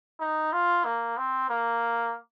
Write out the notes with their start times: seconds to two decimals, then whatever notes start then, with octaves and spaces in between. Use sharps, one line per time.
0.20 D#4
0.53 F4
0.85 A#3
1.18 C4
1.50 A#3